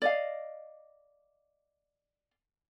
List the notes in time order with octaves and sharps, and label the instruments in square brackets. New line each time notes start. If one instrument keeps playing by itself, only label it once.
[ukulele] D5 D#5 F5